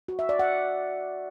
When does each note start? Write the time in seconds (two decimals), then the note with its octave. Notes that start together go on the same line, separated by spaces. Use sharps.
0.08 F#4
0.19 E5
0.29 D5
0.39 F#5